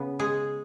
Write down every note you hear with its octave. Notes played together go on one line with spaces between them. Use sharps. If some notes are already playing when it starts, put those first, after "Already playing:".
Already playing: C#3 B3
G#3 G#4